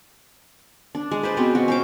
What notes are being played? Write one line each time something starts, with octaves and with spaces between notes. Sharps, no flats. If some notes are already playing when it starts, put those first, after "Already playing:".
D4
G#3
B4 C5 D5
B2 C4 C#4
F#4
C#4 C5 D6